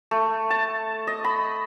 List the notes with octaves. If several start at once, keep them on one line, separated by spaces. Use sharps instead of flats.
A3
A5
D#5
B5